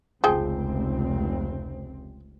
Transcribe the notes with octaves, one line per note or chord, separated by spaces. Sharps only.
F1 C#2 F3 C4 G#4 G5